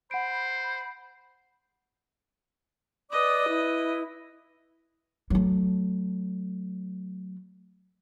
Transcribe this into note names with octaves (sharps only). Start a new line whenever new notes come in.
C5 F#5 B5 D7
B4 D5 D#5 D6 D#6
E4
F#3 A3